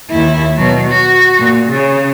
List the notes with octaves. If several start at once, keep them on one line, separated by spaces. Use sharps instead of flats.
D#2 E4
B2 F#3
F#4
A#2
C#3